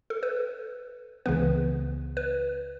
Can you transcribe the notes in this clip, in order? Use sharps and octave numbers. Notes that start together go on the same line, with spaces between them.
A4
B4
C#2 C#3 E3 B3 B4
B4